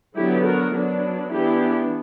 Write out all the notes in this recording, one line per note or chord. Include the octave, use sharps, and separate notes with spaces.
D3 F#3 B3 E4 G4
F#4 A#4
F#3 B3 D4
E3 B3 D4 E4 G4